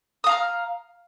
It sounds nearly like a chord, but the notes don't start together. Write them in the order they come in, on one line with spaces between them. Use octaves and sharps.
D#6 F5 A#5 F6